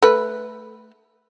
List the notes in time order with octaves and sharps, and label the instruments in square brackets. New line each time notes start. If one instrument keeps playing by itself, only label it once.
[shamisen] A3 B4